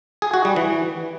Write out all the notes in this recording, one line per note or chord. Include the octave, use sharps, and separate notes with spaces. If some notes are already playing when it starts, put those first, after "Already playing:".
G#4
F#4
G3
E3